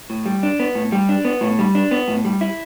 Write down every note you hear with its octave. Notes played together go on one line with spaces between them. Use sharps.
A2
G3
D4
B3
A2
G3
D4
B3
A2
G3
D4
B3
A2
G3
E4